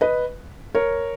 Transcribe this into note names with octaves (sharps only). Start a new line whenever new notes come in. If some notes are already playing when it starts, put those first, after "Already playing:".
B4 D#5
A#4 C#5